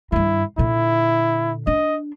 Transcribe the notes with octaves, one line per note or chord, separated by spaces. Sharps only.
G2 D#3 E4
A#2 D3 E4
D4 D#5